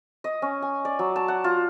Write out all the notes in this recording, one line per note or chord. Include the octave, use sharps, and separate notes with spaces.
D#5
C#4
G#5
D5
F#3
A5
F#5
F4